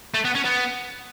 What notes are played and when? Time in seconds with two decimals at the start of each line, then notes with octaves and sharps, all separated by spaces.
0.14 A3
0.25 B3
0.35 C#4
0.45 B3